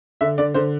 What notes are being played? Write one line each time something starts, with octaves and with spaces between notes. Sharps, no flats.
D3 E5
D3 D5
D3 C5